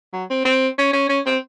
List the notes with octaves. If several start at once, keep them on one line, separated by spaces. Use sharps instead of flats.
F#3
C4
C4
C#4
C#4
C#4
C4